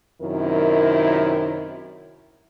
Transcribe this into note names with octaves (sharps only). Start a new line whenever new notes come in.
F#2 C3 D#3 E4 A#4